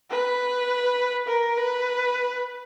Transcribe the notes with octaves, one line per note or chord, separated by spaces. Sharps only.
B4
A#4
B4